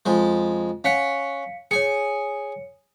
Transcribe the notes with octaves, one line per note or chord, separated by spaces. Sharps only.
F2 G#3
C#4 F5 F#5 B6 C#7
G#4 C#5 G#5 C#7